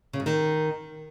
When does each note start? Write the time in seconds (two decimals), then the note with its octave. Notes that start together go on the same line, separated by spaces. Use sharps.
0.13 C#3
0.20 G#2
0.26 D#3